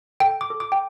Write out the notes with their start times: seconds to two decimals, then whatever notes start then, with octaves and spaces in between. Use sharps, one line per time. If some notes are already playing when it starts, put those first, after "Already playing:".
0.20 A4 G5
0.41 D6
0.50 A4
0.60 D6
0.72 G5